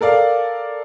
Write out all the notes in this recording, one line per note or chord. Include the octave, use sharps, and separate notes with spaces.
A4 A#4 D5 F5